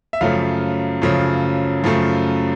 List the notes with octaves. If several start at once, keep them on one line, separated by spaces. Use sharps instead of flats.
E5
F#2 C#3 F3 A3 F5
F#2 C#3 F3 A3
F#2 C#3 F3 A3